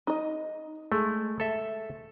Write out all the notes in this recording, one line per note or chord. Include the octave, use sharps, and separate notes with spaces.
D#4 D#5
G#3 A3
A4 E5